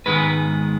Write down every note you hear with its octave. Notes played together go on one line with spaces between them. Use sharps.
G#2 D#3 G#3 B3 B4